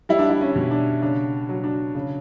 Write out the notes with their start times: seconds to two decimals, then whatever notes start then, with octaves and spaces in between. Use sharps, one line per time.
0.09 G3 E4
0.19 D4
0.30 E4
0.41 C#4
0.56 B2
0.71 D4
1.02 C#3 D4
1.49 F#3
1.64 D4
1.95 C#3